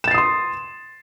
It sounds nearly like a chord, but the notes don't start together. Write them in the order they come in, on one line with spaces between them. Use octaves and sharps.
E7 A6 C7 D#6 C6